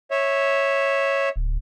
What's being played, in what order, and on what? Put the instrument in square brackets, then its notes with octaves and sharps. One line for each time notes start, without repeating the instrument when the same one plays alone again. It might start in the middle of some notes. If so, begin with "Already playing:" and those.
[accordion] C#5 E5
[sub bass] D1